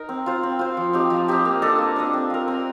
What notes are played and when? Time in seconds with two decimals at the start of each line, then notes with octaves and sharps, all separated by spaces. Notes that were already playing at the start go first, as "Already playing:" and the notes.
Already playing: D#4 A#4 D#5
0.09 C4
0.26 F4 C5
0.43 C4
0.59 F4 C5
0.77 F3
0.93 C4 D#4 G4
1.10 F3
1.28 C4 D#4 G4
1.45 A#3
1.62 D4 A4 D#5
1.78 A#3
1.96 D4 A4 D#5
2.13 C4
2.30 F4 A#4
2.48 C4